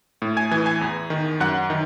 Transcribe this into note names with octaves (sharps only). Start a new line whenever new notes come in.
A2
G#5 G#6
E3 G#5 G#6
G#5 G#6
E2
D#3
F#2 F#5 F#6
D#3